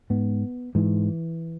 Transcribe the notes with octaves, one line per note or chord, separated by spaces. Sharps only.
G#2 B3
G#2 E3